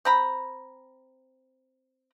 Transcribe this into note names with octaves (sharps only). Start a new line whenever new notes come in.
C4 A#5 B5